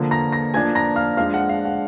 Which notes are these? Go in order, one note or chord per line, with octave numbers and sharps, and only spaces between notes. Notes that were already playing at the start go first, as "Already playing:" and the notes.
Already playing: D3 F3 A#3
A#5 A#6
A#5 A#6
F3 A#3 D4 G#5 G#6
A#5 A#6
F5 F6
F3 G#3 D4 F5 F6
F#5
F5
F#5